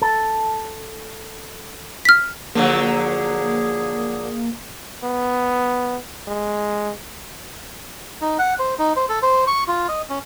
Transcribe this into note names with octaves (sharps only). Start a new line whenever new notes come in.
A4
F6 B6
D3 F3 F#3 A#3 G#4
B3
G#3
D#4
F#5
C5
D#4
C5
A4
C5
C#6
F4
D#5
C#4